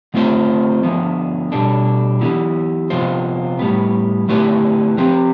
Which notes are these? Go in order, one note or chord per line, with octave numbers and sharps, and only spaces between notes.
D3 A3 C4 F4 C5
D3 F3 B3
B2 G3 D4 A4
E3 B3 E4 G4
C3 F3 B3 F4 C5
A2 G3 B3
D3 A3 E4 G4 B4
F3 C4 G4